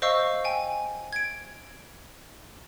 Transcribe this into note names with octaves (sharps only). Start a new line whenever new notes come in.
C5 D#5 F5 C#6 E6
G5 G#5
G#6 D7